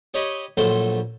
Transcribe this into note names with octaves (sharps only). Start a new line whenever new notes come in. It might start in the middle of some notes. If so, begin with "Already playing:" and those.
G4 C#5 D#5 B5
A#1 F#3 A3 A4 C5 C6